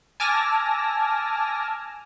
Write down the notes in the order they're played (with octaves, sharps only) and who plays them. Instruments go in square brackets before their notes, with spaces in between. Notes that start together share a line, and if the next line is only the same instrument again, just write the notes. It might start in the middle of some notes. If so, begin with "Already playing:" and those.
[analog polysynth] G#5 A5 D6 E6 F6 A#6